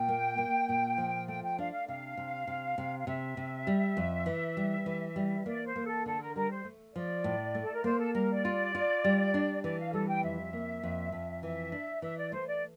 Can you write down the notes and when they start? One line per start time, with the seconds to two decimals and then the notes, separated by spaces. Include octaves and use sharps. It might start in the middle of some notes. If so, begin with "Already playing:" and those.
Already playing: A#2 G5
0.08 A#3
0.38 A#3
0.69 A#2
0.98 F3
1.28 A3 G5
1.43 G5
1.59 D4 F5
1.72 F5
1.88 C3 F5
2.17 C3
2.47 C3
2.78 C3
3.00 F5
3.07 C3 E5
3.37 C3
3.67 G3
3.97 F2
4.26 E3
4.57 G3
4.86 E3
5.16 G3
5.46 A#3 D5
5.66 C5
5.76 A#3
5.85 A4
6.06 D3 A4
6.20 A#4
6.35 G3 A#4
6.51 C5
6.65 A3
6.94 F3 D5
7.24 A2
7.55 A3
7.63 A4
7.74 A#4
7.84 A#3 C5
7.99 A4
8.14 G3 A#4
8.29 D5
8.45 F4
8.75 F4
9.04 G3
9.34 D4
9.63 E3 D5
9.79 F5
9.93 G3 A4
10.08 G5
10.23 F2 E5
10.53 A#3
10.83 F2
11.12 F2
11.43 E3 E5
11.72 D4
12.02 E3 E5
12.17 D5
12.32 A3 C5
12.47 D5